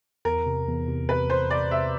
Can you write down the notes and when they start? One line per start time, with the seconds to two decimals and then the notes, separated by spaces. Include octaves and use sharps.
0.25 E2 A#4
0.46 C3
0.67 E2
0.88 C3
1.09 C3 B4
1.29 E2 C5
1.50 C3 D5
1.71 C3 E5